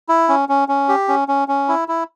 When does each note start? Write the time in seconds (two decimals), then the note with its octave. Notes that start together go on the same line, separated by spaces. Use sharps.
0.09 E4
0.29 C#4
0.49 C#4
0.68 C#4
0.89 G4
1.08 C#4
1.28 C#4
1.48 C#4
1.68 E4
1.88 E4